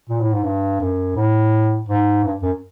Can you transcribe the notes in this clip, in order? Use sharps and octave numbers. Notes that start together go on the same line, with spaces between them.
A#2
A2
G#2
G2
F#2
A2
G#2
G2
F#2